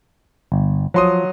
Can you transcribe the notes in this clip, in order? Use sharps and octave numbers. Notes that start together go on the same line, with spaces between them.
G1
F3 F#3 C6 D#6